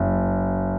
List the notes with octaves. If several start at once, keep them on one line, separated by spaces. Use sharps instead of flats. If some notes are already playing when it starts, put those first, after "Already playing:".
Already playing: F#1